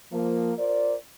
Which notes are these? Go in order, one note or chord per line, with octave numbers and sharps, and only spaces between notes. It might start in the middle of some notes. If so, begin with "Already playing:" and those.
F3 A#3
F4 A#4 C5 D5